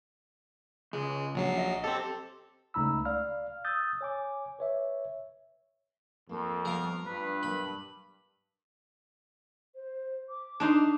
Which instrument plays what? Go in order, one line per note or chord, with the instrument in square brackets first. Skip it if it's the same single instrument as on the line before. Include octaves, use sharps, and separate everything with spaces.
[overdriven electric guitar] C#2 [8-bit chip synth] G#3
[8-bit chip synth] A#1 F#3 C7
[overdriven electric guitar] D#5 E5
[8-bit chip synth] C4 A4 [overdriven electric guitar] G4
[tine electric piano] C#2 A3 D#4 A#5 B5 E6
D5 F5 F6
D#6 E6 G6 A6
C#5 G#5 D6
B4 C#5 E5
[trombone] F2 [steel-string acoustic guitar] A#3 C4 A4
[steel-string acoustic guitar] F3 G3 B3 [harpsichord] A#4 F5
[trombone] G2 [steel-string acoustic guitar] D4 F4 [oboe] B4
[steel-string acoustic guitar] F#2 B2 [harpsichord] B5
[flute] C5
D6
[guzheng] D4 D#4 C6